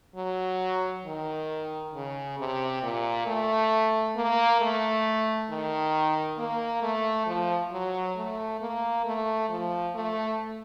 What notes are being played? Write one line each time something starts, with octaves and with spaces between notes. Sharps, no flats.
F#3
D#3
C#3
C3
A#2
A3
A#3
A3
D#3
A#3
A3
F3
F#3
A3
A#3
A3
F3
A3